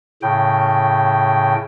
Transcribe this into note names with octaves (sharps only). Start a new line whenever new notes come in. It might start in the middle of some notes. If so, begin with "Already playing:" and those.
A2 C#3 G5